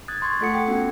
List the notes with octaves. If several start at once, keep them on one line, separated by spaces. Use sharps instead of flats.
D#6 F#6 G#6 A6
C6 C#6 G#6
A3 F4 A4 F#5 C#7
G5
B3 C#4 F#4